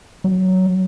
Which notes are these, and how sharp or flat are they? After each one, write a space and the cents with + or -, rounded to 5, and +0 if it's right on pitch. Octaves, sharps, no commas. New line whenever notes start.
F#3 +10